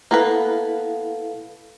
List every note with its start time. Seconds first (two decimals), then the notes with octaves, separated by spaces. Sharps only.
0.11 A#3 B3 E4 A4 B4 F5